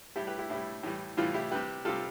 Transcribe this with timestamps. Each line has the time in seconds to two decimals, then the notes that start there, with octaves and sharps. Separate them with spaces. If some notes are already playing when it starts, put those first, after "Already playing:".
0.16 A2 G3 E4 G4
0.27 G4 B4
0.39 E4 G4
0.50 A2 G3 E4
0.83 A2 E3 G3
1.17 A2 E3 G3 F4
1.34 E4 G4
1.51 C3 G3 G4 B4
1.85 C3 G3 F4 A4